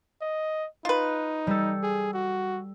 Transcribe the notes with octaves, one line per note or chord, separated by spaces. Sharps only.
D#5
D#4 F4 B4
G3 A4
G#4
F#4